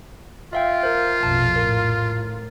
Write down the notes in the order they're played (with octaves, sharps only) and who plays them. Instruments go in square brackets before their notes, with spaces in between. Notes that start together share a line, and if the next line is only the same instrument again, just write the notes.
[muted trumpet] F4 [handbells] E5 F5 G5
[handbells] A#4 C5
[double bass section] A#1 F2 B2 [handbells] A5
[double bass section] A2 [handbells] A#4